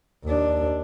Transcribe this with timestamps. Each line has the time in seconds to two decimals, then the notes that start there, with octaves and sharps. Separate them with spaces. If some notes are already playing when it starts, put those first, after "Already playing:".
0.24 D#2 D4